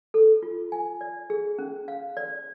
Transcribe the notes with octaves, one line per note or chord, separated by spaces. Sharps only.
A4
F4
G#5
D5
G#4
C#4
F5
D5